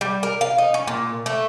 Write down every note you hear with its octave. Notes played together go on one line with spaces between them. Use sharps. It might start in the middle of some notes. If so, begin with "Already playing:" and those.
G3
A#4
F5
D#4
C#4
A#2
A3